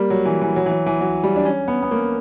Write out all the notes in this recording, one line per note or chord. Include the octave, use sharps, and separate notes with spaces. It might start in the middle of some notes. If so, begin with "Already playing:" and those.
Already playing: G3 A#3
F#3
E3
E3
F#3
E3
F#3
E3
F#3
G3
D4
C#4
B3
B3
A#3